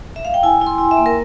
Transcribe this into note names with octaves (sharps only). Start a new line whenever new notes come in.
E5
F5
G5
E4 G#5
E4
C6
E4
E5
A#3
A#4